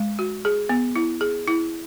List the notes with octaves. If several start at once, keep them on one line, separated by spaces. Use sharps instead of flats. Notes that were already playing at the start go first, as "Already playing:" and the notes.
Already playing: G#3
F#4
G#4
B3
E4
G#4
E4